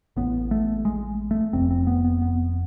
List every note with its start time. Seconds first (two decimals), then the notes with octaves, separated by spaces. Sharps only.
0.16 A1 A2 B3
0.51 A3
0.85 G#3
1.31 A3
1.53 F1 F2 C3 C4
1.71 C4
1.87 B3
2.04 B3
2.22 B3